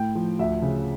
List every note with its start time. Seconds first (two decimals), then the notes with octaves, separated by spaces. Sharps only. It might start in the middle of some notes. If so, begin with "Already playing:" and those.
Already playing: A2 G5
0.15 F3
0.39 D2 E5
0.62 C#3